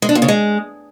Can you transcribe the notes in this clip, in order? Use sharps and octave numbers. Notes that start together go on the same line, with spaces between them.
G#3
D4
A#2
C#3
G#3